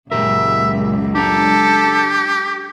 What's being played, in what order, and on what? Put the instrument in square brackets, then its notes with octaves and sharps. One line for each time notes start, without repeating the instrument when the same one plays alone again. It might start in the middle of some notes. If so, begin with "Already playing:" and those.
[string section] C#2 F#2 [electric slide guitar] A#2 G4 A#4 [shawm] E5
[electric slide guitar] D4 A#5 [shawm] G4 [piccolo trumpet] A4